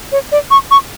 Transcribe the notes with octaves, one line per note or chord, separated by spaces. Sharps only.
C#5
D5
C#6
C#6